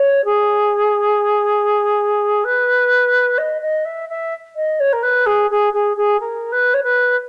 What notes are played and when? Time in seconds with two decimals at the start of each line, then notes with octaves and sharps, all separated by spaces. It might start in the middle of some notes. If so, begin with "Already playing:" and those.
Already playing: C#5
0.24 G#4
2.44 B4
3.38 D#5
3.61 D#5
3.85 E5
4.09 E5
4.55 D#5
4.80 C#5
4.92 A#4
5.02 B4
5.26 G#4
5.50 G#4
5.73 G#4
5.96 G#4
6.19 A#4
6.52 B4
6.74 C#5
6.83 B4